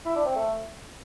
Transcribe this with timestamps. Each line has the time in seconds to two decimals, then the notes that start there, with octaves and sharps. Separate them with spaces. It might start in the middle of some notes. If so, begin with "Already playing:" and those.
0.05 E4
0.15 D4
0.25 C4
0.36 A3